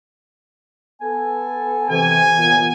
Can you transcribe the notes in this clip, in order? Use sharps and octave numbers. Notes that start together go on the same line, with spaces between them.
B3 A4 G#5
C3 E3 G#5
A#2 B3